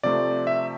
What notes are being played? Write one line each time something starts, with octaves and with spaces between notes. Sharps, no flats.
C3 F3 A3 C4 D5
E5